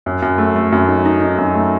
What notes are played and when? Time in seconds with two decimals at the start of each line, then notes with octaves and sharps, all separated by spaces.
0.06 F#2
0.22 F#2
0.38 A3
0.56 A3
0.72 F#2
0.88 D#4
1.05 D#4
1.21 D#4
1.38 F#2
1.55 A3